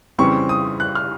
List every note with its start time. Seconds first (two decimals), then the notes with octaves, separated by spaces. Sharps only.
0.18 F2 C#3 E3 G3 C4 C#6
0.49 D#6
0.80 F#6
0.95 F6